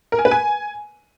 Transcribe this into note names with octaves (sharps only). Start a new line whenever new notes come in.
A#4
G#5
B4
G#5